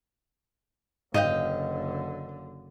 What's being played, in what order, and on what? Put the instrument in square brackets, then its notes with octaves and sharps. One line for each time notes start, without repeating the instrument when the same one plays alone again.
[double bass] F#1 D3 [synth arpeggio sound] G#2 [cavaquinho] D#5 F5 G5